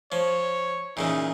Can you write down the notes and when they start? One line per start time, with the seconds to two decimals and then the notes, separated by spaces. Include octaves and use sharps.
0.12 F3 C#5
0.97 A#2 C#3 E3 D#4